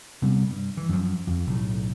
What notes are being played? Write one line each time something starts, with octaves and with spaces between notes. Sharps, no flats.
C3 G3 A3 B3
G2
E3
F#2 F3
F2
B1 A2